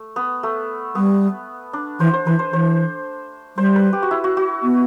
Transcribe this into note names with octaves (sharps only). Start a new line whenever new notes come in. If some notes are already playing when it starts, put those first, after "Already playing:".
Already playing: A3
B3
A3
G3 B3
D4
E3 C5
C5
E3 B4
C5
E3 C5
G3 C5
B4
G4
F#4
E4
F#4
F#4
B3